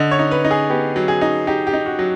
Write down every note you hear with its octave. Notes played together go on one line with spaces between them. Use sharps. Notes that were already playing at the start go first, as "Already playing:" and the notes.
Already playing: D3 D#5
C#5
D#4
B4
D#4
G#4
B3 G4
F#3
G#4
D#4
D#4 G4
G4
D#4
F#4
F#3